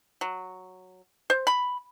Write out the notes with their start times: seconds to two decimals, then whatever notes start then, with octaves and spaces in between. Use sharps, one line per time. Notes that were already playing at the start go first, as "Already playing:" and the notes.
0.21 F#3
1.30 C5
1.47 B5